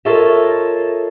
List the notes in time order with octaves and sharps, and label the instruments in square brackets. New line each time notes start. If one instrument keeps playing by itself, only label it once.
[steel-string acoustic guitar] F4 A4 A#4 C#5 D#5 E5